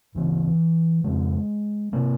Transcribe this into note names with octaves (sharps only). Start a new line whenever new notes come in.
D2 C#3 E3
F2 C#3 G#3
C3 A#3